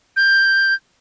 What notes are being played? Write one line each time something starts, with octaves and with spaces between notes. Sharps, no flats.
G6